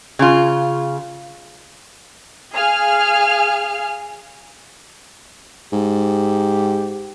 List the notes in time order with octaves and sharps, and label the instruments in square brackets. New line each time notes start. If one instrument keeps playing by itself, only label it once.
[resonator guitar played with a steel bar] C#3 F4
[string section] G#4 F5 G#5 F6
[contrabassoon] G#2 [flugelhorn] G4